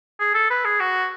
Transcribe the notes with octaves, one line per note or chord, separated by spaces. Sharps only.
G#4
A4
B4
G#4
F#4